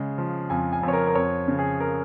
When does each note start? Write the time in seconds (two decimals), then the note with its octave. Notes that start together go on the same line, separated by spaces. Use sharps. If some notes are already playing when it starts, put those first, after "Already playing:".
Already playing: C#3 G#3
0.18 F3
0.50 F2 G#5
0.73 G#5
0.83 F2
0.88 C#5
0.93 A#4
1.07 A#4
1.15 F2 C#5
1.48 C#3
1.59 G#4
1.80 A#4